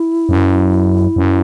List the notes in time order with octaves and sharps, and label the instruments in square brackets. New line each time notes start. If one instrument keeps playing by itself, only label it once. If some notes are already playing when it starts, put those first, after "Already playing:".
Already playing: [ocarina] E4
[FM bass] F#2
F#2